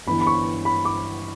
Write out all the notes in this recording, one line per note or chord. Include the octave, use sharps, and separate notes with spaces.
G1 G2 E3 B5
B5
C#6
B5
D6